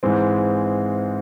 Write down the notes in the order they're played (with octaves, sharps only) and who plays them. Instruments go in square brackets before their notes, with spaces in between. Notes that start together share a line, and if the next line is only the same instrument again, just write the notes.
[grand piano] G#2 E3 G#3 C4